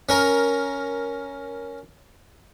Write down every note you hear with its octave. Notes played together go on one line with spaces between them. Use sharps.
C#4 A#4